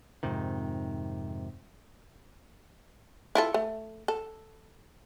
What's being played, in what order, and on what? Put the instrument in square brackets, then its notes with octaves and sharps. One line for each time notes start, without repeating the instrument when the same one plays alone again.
[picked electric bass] F2 G#2 C3 D#3
[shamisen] E4 F4 A4
A3
A4